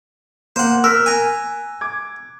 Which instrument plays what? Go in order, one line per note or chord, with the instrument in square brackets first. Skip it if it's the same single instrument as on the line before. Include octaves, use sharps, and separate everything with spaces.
[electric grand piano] A#3 [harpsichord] C5 F#5
[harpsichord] A#4 [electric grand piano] E6 F#6 B6
[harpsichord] G#5 A#5
[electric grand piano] D6 G#6